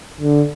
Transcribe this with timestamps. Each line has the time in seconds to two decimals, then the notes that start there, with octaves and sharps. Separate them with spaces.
0.21 D3